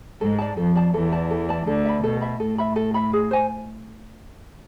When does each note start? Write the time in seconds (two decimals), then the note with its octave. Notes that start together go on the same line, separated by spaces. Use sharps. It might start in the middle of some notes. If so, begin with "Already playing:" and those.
0.21 G#2 G#3 A4
0.38 D5 A5
0.57 F2 F3 A4
0.75 D5 A5
0.94 E2 E3 A4
1.12 D5 A5
1.31 A4
1.49 D5 A5
1.67 D2 D3 A4
1.85 E5 B5
2.03 B2 A4
2.21 E5 B5
2.40 A2 A4
2.58 E5 B5
2.76 A4
2.94 E5 B5
3.13 G#4
3.31 C5 G#5